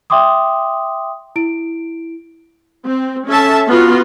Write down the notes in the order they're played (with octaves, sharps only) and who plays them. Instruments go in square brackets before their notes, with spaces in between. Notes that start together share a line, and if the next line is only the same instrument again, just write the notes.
[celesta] E5 G5 C6 D6 D#6
E4 D7
[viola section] C4
C#4 A4 E5 A5
B3 F4 F#4